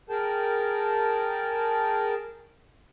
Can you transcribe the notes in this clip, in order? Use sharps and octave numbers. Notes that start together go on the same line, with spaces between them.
G#4 A#4 G5 A5